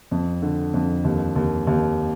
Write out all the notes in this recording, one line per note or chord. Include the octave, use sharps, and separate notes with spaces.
F2
D3
F2
D#2
D#2
D#2